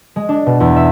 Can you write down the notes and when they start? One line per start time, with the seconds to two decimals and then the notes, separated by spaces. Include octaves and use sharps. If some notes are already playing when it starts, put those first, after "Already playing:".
0.16 G#3
0.29 D4
0.46 B2
0.60 E2
0.76 E5